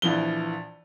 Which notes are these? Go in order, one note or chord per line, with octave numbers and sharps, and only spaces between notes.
A#1 E3 F3 G7